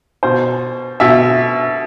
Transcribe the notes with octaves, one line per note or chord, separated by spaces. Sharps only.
B2 C5
B2 E5